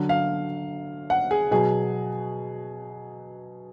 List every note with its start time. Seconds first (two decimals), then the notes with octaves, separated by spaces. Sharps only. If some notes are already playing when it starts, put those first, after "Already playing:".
Already playing: D3 F#3
0.09 F5
1.10 F#5
1.31 G#4
1.51 B2 F#3 G#4